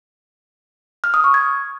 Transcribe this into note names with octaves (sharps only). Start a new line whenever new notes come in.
F6
D#6
C#6
G#6